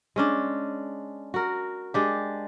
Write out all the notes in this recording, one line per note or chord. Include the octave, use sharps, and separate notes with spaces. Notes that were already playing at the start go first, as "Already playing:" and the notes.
G#3 C#4 D4
F#4 A#4
G#3 D4 G4